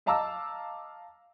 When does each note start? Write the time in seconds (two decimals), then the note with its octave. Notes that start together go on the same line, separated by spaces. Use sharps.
0.06 D#5 F5 A5 A#5 D6 E6